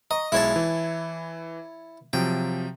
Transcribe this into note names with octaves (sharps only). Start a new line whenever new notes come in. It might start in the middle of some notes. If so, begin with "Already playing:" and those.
D#5 A#5 C#6
B1 G#3 E4 C#5 A5
E3
C3 F3 F#3 G5